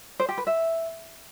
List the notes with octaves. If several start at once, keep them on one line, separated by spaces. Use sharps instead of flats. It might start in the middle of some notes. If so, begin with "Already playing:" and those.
C5
G4
B4
E5